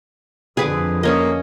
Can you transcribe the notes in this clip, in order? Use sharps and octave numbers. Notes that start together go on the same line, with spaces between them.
F2 D3 G#4 B4 D6
A#3 C#4 C#5 D#5